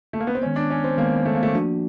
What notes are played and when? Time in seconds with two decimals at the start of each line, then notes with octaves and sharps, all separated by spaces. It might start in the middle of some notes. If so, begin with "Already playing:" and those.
0.13 A3
0.20 A#3
0.27 B3
0.35 C4
0.42 D#3 G#3 B3 C#4
0.56 D4
0.70 C#4
0.84 C4
0.97 D#3 G#3 A#3 B3
1.25 A3
1.35 A#3
1.43 A3
1.53 F3 A#3 D4 F#4